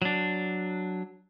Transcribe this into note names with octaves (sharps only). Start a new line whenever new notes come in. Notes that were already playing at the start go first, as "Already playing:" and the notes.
F#3 D4